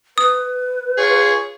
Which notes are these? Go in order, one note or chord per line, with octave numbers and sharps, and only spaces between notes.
B4 D#6
F4 G#4 C#5